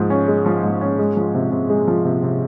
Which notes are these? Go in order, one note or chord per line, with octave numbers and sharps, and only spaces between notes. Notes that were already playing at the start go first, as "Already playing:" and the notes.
Already playing: G#2 F3 G#3
C#4
G#3
F3
G#2
C#4
G#3
F3
C3
C3
G#3
F3
C3
C3